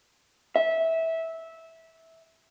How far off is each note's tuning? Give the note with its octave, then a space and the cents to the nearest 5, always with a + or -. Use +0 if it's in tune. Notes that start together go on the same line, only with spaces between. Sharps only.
E5 -15